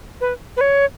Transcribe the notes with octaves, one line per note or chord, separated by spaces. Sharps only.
B4
B4
C#5